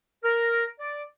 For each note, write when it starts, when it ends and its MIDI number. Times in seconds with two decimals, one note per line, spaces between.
0.24 0.66 70
0.79 1.02 74